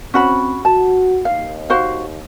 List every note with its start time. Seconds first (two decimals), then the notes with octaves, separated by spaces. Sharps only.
0.14 C4 C#4 F#4 B5
0.65 F#4 A5
1.25 D#2 F5
1.70 F#4 C5 F5